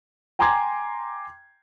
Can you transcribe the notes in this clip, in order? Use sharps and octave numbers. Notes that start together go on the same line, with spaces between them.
G5 G#5 A#5 C6 D6 G#6